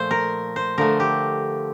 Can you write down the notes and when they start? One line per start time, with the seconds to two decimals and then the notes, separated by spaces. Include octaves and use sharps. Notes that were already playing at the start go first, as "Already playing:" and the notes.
Already playing: A#2 F3 A3 C5
0.11 A#4
0.56 C5
0.78 D3 F3 A3 A#4
1.00 G4